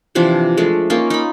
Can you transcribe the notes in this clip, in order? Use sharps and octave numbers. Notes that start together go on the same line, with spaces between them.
C3 E3 F3 D4
G#3 A3 D4
A#3 C#4 D#4 F4
D#4 B5